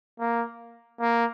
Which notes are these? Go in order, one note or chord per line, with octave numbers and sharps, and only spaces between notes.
A#3
A#3